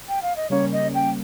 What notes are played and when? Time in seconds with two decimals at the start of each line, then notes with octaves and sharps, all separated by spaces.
0.08 G5
0.22 F5
0.36 D#5
0.50 C#3 G3 A#3 C#4 C#5
0.72 D#5
0.94 G5